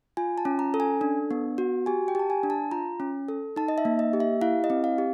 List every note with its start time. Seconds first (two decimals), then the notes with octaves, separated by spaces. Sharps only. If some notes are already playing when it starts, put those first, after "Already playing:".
0.17 F4 G#5
0.38 A5
0.45 C#4
0.59 A#5
0.74 A4
0.80 G#5
1.01 D4
1.31 B3
1.58 F#4
1.86 G4 G#5
2.08 G5
2.15 G4 A5
2.30 G#5
2.43 D4
2.50 A5
2.71 F4 A#5
3.00 C#4
3.28 A4
3.56 D#4 A5
3.68 D#5
3.78 E5
3.85 A#3
3.99 D#5
4.13 G4
4.20 E5
4.41 E4 F5
4.64 D#5
4.70 C4
4.84 F5
4.98 G4